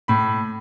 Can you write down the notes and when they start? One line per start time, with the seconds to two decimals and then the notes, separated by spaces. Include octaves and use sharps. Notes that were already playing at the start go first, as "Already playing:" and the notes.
0.08 A2 B5